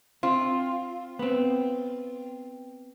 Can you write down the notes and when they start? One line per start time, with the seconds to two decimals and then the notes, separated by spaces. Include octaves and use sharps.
0.23 C4 F4
1.19 B3 C4